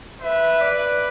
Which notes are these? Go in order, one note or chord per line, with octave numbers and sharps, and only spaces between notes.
B4 E5
D5